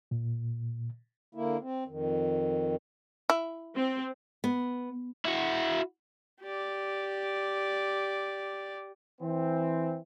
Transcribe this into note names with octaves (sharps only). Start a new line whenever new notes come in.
A#2
D3 A#3 E4
C4
F2 D#3
E4
C4
B3
E4 F#4
G4 D5
E3 C4